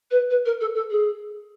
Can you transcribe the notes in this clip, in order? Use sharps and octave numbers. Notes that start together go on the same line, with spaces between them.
B4
B4
A#4
A4
A4
G#4